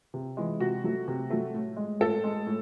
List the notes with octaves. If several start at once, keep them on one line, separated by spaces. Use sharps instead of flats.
C3
E3 G#3
C3 F#4
F#3 A3
C3
F#3 A3
A2
G#3
A2 A4
G#3
A2